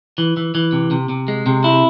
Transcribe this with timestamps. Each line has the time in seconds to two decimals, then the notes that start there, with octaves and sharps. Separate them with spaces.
0.18 E3
0.37 E3
0.55 E3
0.73 C3
0.91 C3
1.09 C3
1.28 G#3
1.46 C3
1.64 E4